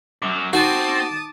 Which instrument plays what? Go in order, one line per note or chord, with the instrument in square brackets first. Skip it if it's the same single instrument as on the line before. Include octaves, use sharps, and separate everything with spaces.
[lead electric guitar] F#2 F#3 [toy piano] D6
[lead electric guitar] C4 [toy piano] D#4 [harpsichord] F#4 [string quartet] A5 D6 D#6